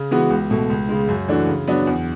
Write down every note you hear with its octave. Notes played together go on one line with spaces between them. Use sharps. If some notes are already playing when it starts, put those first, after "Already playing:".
Already playing: C#3
E3 G#3 B3 F#4
C#2
B2 A3
C#2
C#3 G#3
F#2
E3 A3 D4 F#4
C#3
F#3 B3 D4
E2